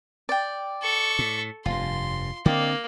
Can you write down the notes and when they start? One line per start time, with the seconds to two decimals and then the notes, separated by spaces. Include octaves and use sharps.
0.29 D5 G5
0.82 A4 C#6
1.19 A2
1.66 F1 G2 F4 C6
2.46 D3 A#3 C4 D5 D#5 G5